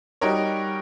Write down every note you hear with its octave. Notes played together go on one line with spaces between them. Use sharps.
G3 D#4 F#4 A#4 C#5